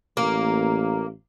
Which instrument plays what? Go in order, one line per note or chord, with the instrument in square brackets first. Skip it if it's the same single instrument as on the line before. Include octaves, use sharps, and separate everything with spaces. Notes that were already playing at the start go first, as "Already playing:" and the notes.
[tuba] A1 [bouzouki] A#3